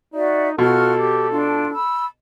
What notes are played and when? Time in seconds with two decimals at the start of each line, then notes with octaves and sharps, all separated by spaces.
0.14 D#4 F#4 D5 E5
0.59 B2 F4 F#4 A4 F6
0.96 G4
1.29 D4 F4
1.73 B5 E6